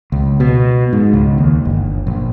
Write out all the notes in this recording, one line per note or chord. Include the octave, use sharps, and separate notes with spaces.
C#2
B2
G#2
C#2
D#2
G1
A#1